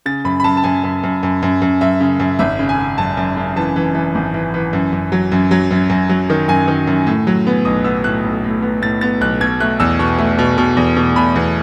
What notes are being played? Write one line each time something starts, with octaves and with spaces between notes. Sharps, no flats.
C#3 A6
F#2 B5
B5
F#2 A5
A5
F#2 G#5
F#2
F#2
F#2
F#2
F#2
F#2 E5
C#3
F#2
G#1 E5
C#3
G#5
C#3
F#2 A5
F#2
C#3
E3 A5
E3
E3
G#1
E3
E3
F#2
F#2
F#3
F#2
F#3
F#2
F#2
F#3
D#3
F#2 G#5
D#3
F#2
A2
F#3
B3
B1 D#6
B3 E6
A2 F#6
B1
A2
B3
A2 A6
B3 A6
B1 F#6
B2 G#6
A3 F#6
E2 E6
B2 C#6
A3
B2
B2
E2
B2
B2 B5
E2